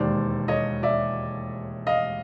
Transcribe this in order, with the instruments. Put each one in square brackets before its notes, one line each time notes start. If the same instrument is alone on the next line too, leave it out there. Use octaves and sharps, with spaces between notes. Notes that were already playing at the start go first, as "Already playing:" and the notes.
Already playing: [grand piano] E1 D#2 D#3 C5 D5
C#5 D#5
D5 E5
D#5 F5